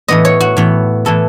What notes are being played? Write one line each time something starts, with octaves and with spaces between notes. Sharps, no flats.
A2 E3 B3 D#5
C#5
F#4
A2 E3 B3
A2 E3 B3 A4